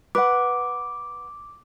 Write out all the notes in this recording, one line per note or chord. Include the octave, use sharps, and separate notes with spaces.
B4 F#5 D6